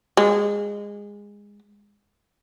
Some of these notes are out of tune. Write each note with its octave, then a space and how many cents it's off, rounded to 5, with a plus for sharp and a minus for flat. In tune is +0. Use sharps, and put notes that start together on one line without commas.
G#3 -20